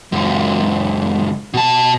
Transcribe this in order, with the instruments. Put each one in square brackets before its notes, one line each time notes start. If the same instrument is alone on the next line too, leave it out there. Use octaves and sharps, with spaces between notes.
[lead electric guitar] C#2 F#2
B2 A5